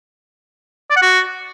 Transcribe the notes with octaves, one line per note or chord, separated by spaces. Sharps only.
D5
F#5
F#4